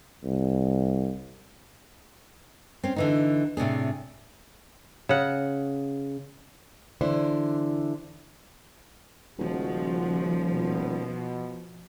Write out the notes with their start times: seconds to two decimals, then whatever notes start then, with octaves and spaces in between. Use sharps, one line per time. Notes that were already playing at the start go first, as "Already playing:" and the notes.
0.24 C2
2.84 C4 C#4
2.96 D3 E3 D#4
3.57 A2 C3 D4 G#4
5.09 C#3 F#5
7.01 D3 E3 D4 E4 C5
9.38 D#1 C#3 F3 G#3 F#4
10.49 B2